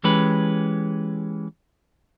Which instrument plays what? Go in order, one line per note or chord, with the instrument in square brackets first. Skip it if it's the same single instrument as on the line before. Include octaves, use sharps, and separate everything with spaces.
[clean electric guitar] E3 G#3 C#4 G4 B4